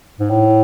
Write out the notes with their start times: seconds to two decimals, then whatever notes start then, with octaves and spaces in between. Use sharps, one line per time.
0.20 G#2
0.30 A2